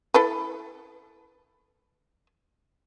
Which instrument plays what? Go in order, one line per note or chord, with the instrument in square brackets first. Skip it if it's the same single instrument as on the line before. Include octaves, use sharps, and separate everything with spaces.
[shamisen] E4 A4 B4